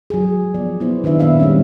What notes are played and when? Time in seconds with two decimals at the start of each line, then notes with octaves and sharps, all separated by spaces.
0.10 F#3 G#4
0.54 F3 B3 D5
0.80 B3 E4 C5
1.04 D#3 D4 B4 E5
1.19 A#2 B3 E5 F5
1.40 G3 G#3 C4 C#4